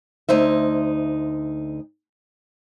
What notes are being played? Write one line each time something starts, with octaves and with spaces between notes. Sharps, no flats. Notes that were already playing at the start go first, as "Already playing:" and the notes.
D2 D#4 C5 E5